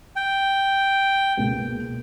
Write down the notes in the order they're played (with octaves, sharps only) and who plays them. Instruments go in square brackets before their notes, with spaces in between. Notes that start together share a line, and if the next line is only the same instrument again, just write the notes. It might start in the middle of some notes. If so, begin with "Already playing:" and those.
[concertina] G5
[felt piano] C#2 B2 A#3